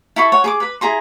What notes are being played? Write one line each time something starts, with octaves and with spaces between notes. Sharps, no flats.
E4 A4 B5 C#6
C#5 F#5
G#4 C#6 D6
B4 B5
E4 G#4 A#5 C6